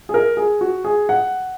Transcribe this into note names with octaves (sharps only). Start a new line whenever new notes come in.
G#4
A#4
G#4
F#4
G#4
F#5